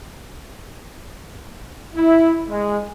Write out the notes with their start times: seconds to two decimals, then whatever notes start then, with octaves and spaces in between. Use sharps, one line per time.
1.95 E4
2.48 G#3